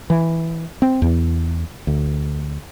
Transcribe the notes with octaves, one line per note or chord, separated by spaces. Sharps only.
E3
C4
E2
D2